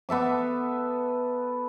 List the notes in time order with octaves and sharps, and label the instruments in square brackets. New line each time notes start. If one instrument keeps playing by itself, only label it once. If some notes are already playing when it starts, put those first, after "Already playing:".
[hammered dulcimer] B3 A4 E5 D6